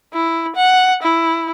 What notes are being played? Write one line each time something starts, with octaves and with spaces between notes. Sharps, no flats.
E4
F#5
E4